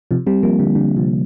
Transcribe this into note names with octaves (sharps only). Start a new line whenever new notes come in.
C3 F3
G3 C4
F3 A#3
D3 G3
D3 G3
C3 F3